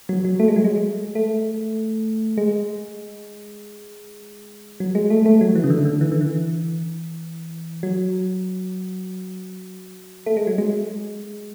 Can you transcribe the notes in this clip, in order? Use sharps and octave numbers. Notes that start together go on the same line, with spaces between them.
F#3
F#3
A3
G#3
F#3
G#3
A3
G#3
F#3
G#3
A3
A3
F#3
E3
C#3
D3
D3
E3
D3
E3
F#3
A3
G#3
F#3
G#3